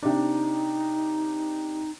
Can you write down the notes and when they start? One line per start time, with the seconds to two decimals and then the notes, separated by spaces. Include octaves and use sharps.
0.03 C3 D4 D#4